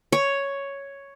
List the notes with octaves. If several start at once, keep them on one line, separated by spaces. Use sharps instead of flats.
C#5